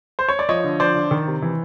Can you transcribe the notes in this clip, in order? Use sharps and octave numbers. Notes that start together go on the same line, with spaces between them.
C5
C#5
D5
F3 C#5 D#5
D3
F3 C5 D5
D3
D#3
C3
E3